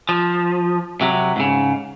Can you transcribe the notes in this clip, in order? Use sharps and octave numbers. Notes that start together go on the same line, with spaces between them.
F3
C3 F#3
G#2 C#3